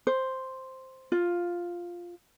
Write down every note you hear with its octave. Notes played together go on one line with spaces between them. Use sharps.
C5
F4